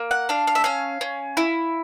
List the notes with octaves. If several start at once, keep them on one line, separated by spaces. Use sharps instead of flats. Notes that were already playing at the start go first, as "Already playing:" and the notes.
Already playing: A#3
F#5
D4 F5
F5
E5
C#4 F5
C#4
E4